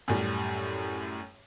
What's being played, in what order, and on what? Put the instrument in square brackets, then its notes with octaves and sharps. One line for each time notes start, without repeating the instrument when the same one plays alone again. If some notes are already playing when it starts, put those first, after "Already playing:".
[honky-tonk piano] F#2 A2 G3